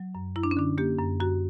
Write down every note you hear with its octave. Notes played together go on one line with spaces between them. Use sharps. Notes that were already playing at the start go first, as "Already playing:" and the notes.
Already playing: F#3
F#2
F#2 E4
D4
C#4
D3 D4
A#3 G4
F#2
F#2 F#4